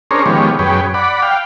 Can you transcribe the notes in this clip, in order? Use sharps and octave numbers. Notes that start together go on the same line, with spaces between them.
C#4 D4 G#4 A#4 C5 C#5
D#3 F3 G#3 B3 G4 C#5
F#2 G#4 B4 C#5 G5
D5 F#5 B5
F5 G5